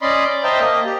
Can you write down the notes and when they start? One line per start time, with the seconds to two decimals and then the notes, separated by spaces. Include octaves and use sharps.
0.02 C#4 D5 D#5 B5 C6
0.30 D5
0.44 C5 D#5 E5 G5 A5 A#5
0.60 A#3 D#5
0.86 G4